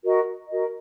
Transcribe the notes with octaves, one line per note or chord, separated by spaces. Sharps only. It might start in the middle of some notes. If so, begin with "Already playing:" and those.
F#4 A#4 D#5
F#4 A#4 D#5